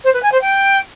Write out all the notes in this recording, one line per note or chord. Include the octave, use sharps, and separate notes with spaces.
C5
B4
G#5
C5
G5